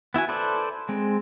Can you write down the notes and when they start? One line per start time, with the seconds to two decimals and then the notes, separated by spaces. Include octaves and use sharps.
0.14 B3 E4 F#4 G#5
0.29 A4 B4 C5 D5 E5
0.89 G#3 C4